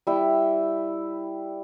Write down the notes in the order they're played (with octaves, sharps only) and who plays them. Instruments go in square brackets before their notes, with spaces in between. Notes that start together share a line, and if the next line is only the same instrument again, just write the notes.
[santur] G3 E4 G5